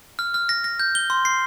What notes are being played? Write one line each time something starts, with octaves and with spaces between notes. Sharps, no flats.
F6
F6
A#6
A#6
G6
G7
C6
C7